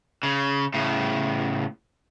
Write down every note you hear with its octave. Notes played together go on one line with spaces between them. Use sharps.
C#3
A2 C#3